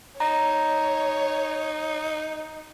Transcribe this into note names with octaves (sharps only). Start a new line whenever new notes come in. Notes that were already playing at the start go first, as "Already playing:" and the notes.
D#4 C#5 A#5